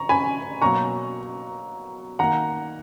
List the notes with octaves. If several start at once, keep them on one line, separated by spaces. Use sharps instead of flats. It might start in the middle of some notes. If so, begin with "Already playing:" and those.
Already playing: C#3 A#5 C#6
G#5 B5
B2 F#3 A#3 A#5 C#6
D#3 A#3 F#5 A#5